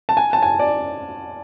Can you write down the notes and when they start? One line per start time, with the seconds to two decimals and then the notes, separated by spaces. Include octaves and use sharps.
0.09 A5
0.17 G#5
0.33 A5
0.42 G#5
0.59 D5